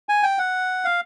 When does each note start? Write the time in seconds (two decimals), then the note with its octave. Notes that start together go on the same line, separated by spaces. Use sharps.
0.09 G#5
0.23 G5
0.38 F#5
0.85 F5